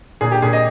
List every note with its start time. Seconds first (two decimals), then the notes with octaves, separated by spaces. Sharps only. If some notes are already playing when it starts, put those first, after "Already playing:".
0.21 A#2 G#4
0.32 G4
0.42 A#2 G#4
0.53 D#5